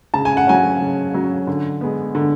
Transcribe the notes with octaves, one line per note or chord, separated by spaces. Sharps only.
C#3 A5
G#5
F#5
F#3 C#4 G#5
C#3
F#3 C#4
D3
G#3 B3
D3